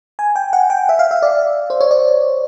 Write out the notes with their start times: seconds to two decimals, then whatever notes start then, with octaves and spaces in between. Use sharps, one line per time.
0.19 G#5
0.36 G5
0.53 F#5
0.70 G5
0.89 E5
0.99 F5
1.11 E5
1.22 D5
1.70 C5
1.81 C#5
1.91 D5